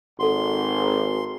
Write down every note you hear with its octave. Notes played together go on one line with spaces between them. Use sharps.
G#1 A4 F#5 C6